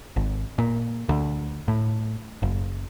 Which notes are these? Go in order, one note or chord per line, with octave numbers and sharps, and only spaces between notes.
G#1
A#2
D2
A2
F#1